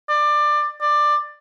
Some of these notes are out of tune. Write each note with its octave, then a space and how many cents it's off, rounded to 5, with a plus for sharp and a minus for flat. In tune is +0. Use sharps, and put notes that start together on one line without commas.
D5 +20
D5 +15